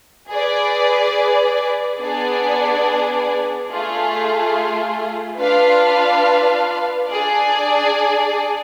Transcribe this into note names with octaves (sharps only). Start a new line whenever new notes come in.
G#4 B4 D5
B3 D4 G#4 D5
A3 F4 G#4
D4 F4 B4 F5
D4 G#4 D5